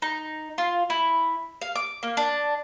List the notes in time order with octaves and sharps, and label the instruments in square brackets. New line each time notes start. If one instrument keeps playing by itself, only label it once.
[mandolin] D#4
F4
E4
F5
D6
A#3
D4